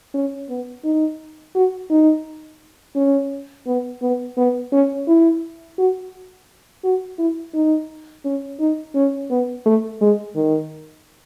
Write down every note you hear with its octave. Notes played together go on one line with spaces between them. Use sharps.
C#4
B3
D#4
F#4
D#4
C#4
B3
B3
B3
C#4
E4
F#4
F#4
E4
D#4
C#4
D#4
C#4
B3
A3
G#3
D#3